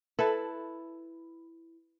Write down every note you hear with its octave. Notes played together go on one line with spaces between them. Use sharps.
E4 A4 B4 A5